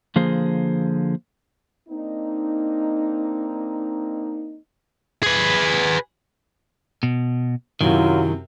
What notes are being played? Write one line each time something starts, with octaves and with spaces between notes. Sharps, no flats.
D3 F3 A#3 G#4 C5
A#3 C4 D4 D#4
G#4 B4
B2
F#2 C3 D#3 F#3 E4 F4